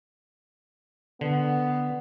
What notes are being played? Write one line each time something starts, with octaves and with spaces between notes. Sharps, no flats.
D3 B3